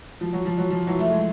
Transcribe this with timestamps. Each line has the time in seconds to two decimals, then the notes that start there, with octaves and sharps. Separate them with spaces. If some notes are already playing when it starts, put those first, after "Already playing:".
0.21 F3
0.33 F#3
0.45 F3
0.58 F#3
0.70 F3
0.87 E3 F#3
0.99 A3
1.10 G#3